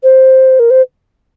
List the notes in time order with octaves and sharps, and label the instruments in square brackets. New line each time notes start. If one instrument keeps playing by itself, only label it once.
[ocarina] C5
A#4
C5